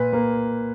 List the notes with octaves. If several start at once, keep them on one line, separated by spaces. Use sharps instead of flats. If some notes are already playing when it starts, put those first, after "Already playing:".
Already playing: A#2 B4
A#3